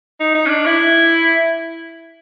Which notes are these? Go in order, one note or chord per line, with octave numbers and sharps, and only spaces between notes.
D#4
D#4
C#4
D4
E4